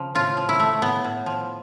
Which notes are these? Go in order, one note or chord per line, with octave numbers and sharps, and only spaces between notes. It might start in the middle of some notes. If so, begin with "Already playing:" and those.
Already playing: C#3 F3
A2 F4
F3
E4
A3
A2 B3
A2
F3